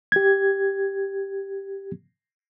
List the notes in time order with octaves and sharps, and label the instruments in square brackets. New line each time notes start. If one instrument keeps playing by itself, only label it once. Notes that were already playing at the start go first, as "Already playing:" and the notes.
[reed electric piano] G4 G#6